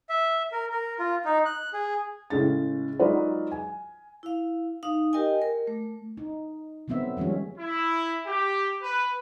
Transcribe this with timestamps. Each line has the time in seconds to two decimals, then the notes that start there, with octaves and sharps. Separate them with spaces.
0.09 E5
0.52 A#4
0.72 A#4
0.99 F4
1.25 D#4
1.45 F#6
1.73 G#4
2.30 A2 C#3 G#3 A6
2.99 F#3 G#3 D#4 F4 B4 D5
3.52 G#5
4.23 E4 F5
4.83 D#4 F5 D#6
5.13 G4 A#4 D#5 G5 G#5
5.42 A#4
5.67 A3
6.17 D#4
6.88 D3 F#3 B3 C4 E5
7.17 D#3 F3 G3 G#3 C#4
7.58 E4
8.26 G4
8.83 B4